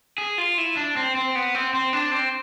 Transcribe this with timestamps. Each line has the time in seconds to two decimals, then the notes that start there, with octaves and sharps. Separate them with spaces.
0.18 G#4
0.38 F4
0.58 E4
0.77 D4
0.97 C4
1.16 C4
1.35 B3
1.55 C4
1.74 C4
1.93 D4
2.12 C4